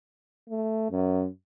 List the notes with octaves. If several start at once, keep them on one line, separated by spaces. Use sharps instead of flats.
A3
F#2